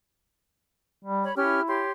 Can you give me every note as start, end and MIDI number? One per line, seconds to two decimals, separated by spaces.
1.05 1.27 55
1.23 1.34 73
1.23 1.34 83
1.37 1.61 61
1.37 1.83 64
1.37 1.61 67
1.37 1.61 89
1.68 1.91 67
1.68 1.91 73
1.68 1.91 84